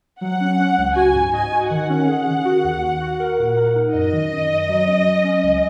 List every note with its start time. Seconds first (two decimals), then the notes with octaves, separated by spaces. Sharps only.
0.21 F#3 F#5
0.40 C#4
0.59 C#4
0.78 C#2
0.96 F#4 G#5
1.14 G#2
1.33 D#5 G#5
1.52 F#4
1.70 D#3 F#5
1.89 C#4
2.08 G#4
2.26 D#3
2.45 F#4
2.64 D#2
2.82 D#2
3.01 F#4
3.20 A#4
3.39 A#2
3.57 A#4
3.75 D#4
3.94 F#2 D#5
4.12 D#3
4.32 F#2
4.51 F#2
4.69 F#3
4.87 C#4
5.06 F#3
5.24 C#4
5.43 C#2